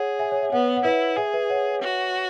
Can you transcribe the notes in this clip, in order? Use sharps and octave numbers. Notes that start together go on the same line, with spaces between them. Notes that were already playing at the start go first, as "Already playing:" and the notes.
Already playing: G#4 C#5 F#5
E5 G#5
C#5
E5
B3 C#5 F#5
F#5
E4 B4 E5
G#4 E5 G#5
B4 E5
C#5 F#5
F#4